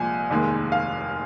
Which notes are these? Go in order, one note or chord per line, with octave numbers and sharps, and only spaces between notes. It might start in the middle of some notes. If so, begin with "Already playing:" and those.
Already playing: C2 A#2 F3 G#3 G#5
F1 D#2 D#3 G#3
F5